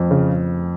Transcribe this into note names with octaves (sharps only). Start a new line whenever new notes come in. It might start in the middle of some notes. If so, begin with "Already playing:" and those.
Already playing: F2
C#3